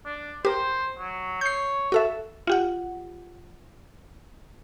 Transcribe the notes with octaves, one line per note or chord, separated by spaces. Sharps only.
D4
G4 A#4 C5
F#3
C#5 G6 C7
F#4 A4 E5
F4 G4 F#5